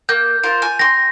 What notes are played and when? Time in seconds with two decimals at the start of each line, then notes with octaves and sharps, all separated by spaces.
0.09 A#3 G6
0.43 F4 A#4 C5
0.62 G#5
0.79 G5 C6 A#6